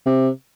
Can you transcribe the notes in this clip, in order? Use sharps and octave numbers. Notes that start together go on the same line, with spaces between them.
C3